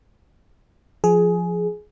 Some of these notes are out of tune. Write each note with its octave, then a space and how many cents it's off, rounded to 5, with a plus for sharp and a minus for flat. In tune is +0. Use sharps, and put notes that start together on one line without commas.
F3 +0 G#4 +15